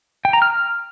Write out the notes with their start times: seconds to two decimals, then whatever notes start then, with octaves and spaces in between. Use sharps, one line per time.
0.25 G5
0.33 A#5
0.42 F6